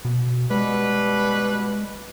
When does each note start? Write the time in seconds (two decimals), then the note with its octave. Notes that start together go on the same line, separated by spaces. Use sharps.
0.05 B2
0.51 B2 G3 G#3 B4